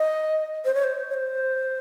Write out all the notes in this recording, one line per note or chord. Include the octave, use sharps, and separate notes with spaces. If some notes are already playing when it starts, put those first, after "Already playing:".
Already playing: D#5
C5
C#5
C5
C#5
C5